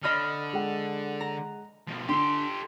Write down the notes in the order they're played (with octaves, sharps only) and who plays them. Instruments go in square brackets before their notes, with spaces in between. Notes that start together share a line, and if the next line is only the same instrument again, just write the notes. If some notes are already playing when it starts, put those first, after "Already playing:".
[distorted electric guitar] D3 [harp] D#5 B5 F6
[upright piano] G#3 F#5
[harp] A#5
[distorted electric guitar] B2 F3
[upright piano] D3 D4 [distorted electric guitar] G4 A4 [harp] C6